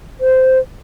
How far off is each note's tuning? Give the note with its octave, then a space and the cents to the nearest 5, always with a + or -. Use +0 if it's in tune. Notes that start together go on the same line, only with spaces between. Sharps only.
C5 -10